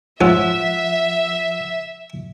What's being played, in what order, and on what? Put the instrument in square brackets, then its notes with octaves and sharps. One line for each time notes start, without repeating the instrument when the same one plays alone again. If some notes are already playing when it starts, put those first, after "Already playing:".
[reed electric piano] F3 F#5 E6 [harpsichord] G#3 C#4 F4 [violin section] E5